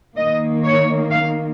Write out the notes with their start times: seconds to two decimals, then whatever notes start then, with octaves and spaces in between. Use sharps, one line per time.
0.17 D#3 A#3 D#5
0.64 C#5
1.11 F5